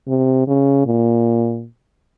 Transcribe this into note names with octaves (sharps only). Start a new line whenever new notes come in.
C3
C#3
A#2